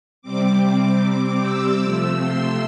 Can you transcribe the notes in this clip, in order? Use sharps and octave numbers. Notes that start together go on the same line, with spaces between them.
C3 G3 C4 D6
D6
E6
C3 F3 A3 C4 E6
C6